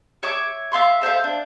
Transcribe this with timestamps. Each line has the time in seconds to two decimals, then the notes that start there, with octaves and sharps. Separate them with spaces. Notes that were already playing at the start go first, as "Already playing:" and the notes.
0.23 C#5 E5 C#6 D6
0.72 E5 F5 C6 C#6
1.01 A4 C5 E5 F5
1.24 D4